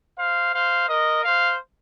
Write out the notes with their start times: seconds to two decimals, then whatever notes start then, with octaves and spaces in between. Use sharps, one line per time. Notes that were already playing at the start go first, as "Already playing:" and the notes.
0.18 C5 F5
0.54 C5 F5
0.88 A#4 D#5
1.24 C5 F5